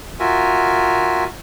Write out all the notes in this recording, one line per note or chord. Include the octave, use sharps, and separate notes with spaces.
F4 F#4 A#4 E5 G#5